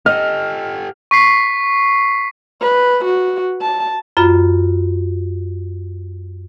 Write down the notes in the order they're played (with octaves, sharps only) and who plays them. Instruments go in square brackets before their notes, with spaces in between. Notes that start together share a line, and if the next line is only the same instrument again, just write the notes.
[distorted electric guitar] G4 A4 [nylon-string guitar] D#5 [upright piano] F6
[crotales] C#6 B6 C7
[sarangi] B4
F#4
A5
[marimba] F#2 F4 B5